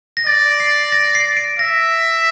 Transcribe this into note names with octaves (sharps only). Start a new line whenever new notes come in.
A#6
D5 A6
C7
A#6
C7
D7
E5 A#6